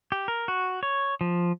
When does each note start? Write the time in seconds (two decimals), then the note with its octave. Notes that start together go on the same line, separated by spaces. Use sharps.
0.12 G4
0.28 A#4
0.48 F#4
0.83 C#5
1.21 F3